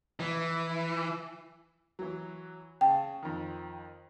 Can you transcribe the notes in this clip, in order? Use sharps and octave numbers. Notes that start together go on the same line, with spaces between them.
E3
E3 F#3
C#3 G5 A5
F2 D#3